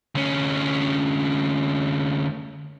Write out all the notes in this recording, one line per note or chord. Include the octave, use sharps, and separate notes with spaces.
D2 C#4